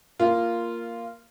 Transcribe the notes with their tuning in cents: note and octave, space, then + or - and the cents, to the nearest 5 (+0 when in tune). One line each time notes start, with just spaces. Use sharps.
A#3 +0 F4 -10